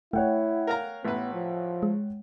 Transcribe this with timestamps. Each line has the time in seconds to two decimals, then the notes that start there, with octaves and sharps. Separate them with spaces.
0.13 A3 E4 C#5 F#5 G5
0.67 A#4 F5 A#5
1.05 A1 B3 B4
1.34 F3
1.83 G#3